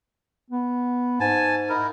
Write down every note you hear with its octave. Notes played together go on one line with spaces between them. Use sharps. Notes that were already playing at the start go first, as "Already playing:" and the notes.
B3
G#2 G#5 A5
D#4 E4 A#4